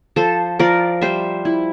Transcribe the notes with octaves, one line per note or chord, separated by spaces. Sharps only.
F3 A4 C5
F3 A#4 D5
G3 C5 E5
E4